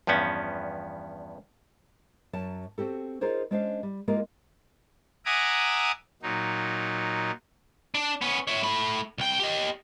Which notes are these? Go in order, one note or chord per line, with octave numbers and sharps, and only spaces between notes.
E2 G2 F3 B3 C#4
F#2 F#3 A5
C4 F#4 G4 A4
D#4 F4 G#4 A#4 C5 C#5
G#3 C#4 D4 C5 F5
G3
G#3 A#3 F4 G4 A#4
E5 F#5 G#5 A#5 D6 D#6
A#2 F#3 D#4
D4
B3 C#4
C#5 E5
A3 B5
C2 G5
G4 D#5